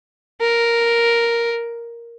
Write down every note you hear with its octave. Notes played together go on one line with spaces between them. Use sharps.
A#4